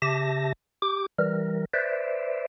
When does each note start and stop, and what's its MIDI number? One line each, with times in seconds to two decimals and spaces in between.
0.02 0.53 49
0.02 0.53 67
0.02 0.53 76
0.02 0.53 81
0.02 0.53 94
0.82 1.06 67
0.82 1.06 86
1.18 1.65 52
1.18 1.65 55
1.18 1.65 70
1.73 2.46 71
1.73 2.46 72
1.73 2.46 74
1.73 2.46 76